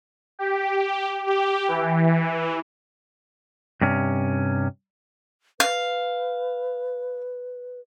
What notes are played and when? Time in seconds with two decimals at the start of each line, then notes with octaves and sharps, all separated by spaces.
0.39 G4
1.27 G4
1.68 E3
3.81 G2 C3 C#4
5.60 B4 F5